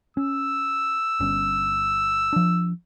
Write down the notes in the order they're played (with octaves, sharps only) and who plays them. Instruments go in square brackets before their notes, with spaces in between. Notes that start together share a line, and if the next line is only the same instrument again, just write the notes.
[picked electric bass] C#4 [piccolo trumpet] E6
[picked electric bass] G1 G2 C#4
F3 D4